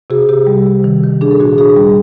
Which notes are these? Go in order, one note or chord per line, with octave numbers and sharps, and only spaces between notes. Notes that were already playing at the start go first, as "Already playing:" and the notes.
C3 F#4 G#4
C3 G4
G3
C3
D#3
D#3
D4 G#4
A4
A#2 F#4 G#4
D4 F#4 G#4
G3